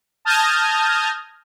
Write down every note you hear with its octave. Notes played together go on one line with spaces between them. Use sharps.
A5 D#6 F6 G6 G#6 A#6